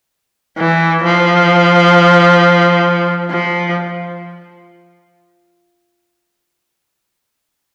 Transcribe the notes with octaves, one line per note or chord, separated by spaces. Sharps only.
E3
F3
F3